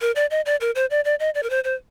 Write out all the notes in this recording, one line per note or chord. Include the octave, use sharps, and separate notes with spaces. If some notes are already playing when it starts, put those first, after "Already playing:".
A#4
D5
D#5
D5
A#4
C5
D5
D5
D#5
D5
A#4
C5
C5